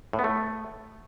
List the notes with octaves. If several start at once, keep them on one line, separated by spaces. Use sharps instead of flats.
A2
B3
A3